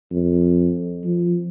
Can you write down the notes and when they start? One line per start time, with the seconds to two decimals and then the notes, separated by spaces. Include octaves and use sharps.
0.11 F2
1.04 F3